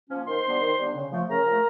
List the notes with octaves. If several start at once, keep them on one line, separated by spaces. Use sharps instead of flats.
F3 A#3 C#4
D#3 C5 C6
G3 B3 D4
D#3
G3 B3 D4
C#3
F3 A3
C#3 A#4 A#5
F3 A3